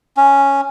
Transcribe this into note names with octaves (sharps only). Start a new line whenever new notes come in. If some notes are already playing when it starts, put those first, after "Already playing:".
C#4